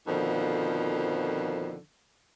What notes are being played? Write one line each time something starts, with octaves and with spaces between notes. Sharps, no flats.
F2 B2 D3 D#3 F3